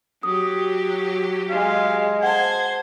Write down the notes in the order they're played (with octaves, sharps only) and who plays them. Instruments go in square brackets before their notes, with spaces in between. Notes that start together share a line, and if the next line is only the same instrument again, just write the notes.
[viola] F#3 G4 [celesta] D#6
[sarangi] G#3 [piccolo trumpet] F5
[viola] C5 [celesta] F#5 A5 [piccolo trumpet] G#6